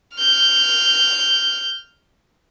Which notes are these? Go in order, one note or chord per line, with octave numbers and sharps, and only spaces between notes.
F6 G6